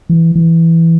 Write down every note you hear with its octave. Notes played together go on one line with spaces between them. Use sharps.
E3
E3